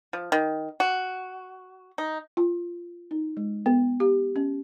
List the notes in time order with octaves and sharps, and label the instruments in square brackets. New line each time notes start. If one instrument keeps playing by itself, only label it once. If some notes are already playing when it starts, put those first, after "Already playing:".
[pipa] F3
D#3
F#4
D#4
[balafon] F4
D#4
G#3
B3
G4
C#4